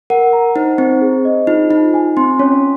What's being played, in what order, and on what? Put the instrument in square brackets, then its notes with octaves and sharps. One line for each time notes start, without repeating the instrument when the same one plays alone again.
[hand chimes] A#4 [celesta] F#5
[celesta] A#5
[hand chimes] D#4 [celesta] C5
[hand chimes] C4 [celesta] C5
[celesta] G#4
D#5
[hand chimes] D#4 [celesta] F4
[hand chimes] D#4 [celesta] F4
[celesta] G#5
[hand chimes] C4 [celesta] C6
[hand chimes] C#4 [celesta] C#5